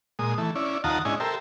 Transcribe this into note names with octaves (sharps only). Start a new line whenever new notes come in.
A#2 G#3 D#6
E3 A3
C#4 E4 D5
D#2 F4 F#5 A5 A#5 D#6
G#2 C#4 D4 E4 D#5 G#5
G4 A4 A#4 C5 E5